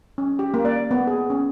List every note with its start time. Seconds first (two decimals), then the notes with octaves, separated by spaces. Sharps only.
0.18 C#4
0.39 G4
0.54 A#3
0.65 D5
0.91 B3
1.07 G#4
1.30 C#4